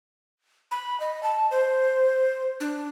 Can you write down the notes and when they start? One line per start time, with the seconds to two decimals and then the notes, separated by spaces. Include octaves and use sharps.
0.71 B5
1.00 D#5
1.23 A5
1.51 C5
2.60 D4